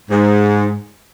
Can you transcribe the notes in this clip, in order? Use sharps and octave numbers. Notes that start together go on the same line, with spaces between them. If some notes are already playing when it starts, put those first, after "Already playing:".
G#2